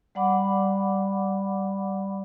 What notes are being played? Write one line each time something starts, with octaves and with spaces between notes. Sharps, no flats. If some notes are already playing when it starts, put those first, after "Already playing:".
G3 D5 F#5 B5 D6